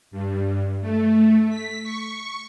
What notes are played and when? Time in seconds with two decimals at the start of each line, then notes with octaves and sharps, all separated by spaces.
0.11 G2
0.81 A3
1.50 B6
1.84 C#6